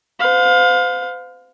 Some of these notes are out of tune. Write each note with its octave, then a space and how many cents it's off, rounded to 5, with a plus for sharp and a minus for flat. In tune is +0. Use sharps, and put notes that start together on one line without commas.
C5 -35 F5 +25